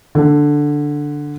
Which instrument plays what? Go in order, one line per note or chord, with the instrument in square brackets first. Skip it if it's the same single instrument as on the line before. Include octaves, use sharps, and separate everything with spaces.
[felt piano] D3